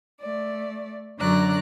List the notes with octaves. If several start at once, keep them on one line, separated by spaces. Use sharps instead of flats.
A3 D5
F#2 D3 F#3 D5 A#5 F#6